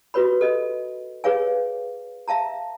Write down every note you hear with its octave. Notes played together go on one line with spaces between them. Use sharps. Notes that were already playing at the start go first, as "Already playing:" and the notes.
F4 F#4 B4 C#5 B5
A4 D#5
G#4 B4 C#5 F5 G#5
E5 F5 A5 A#5